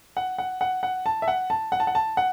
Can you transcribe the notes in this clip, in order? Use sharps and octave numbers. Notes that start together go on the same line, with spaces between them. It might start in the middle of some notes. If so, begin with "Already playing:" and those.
F#5
F#5
F#5
F#5
A5
E5
F#5
A5
F#5
A5
F#5
A5
F#5